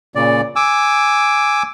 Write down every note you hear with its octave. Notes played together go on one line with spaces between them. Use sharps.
A#2 C#3 D5
G#5 D6 E6